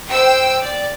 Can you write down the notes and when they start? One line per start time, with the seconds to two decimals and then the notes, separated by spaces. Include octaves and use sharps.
0.10 C5 G5 E6
0.61 D5